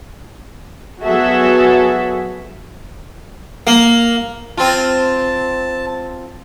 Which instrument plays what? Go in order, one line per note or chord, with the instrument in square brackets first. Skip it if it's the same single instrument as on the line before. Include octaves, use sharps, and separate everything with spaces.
[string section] F#3 B3 F#4 G#4 A4 E5
[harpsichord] A#3
[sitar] C4 F4 [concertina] A5